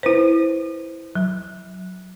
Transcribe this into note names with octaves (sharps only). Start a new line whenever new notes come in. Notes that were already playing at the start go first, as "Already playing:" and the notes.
E4 B4 C5
F#3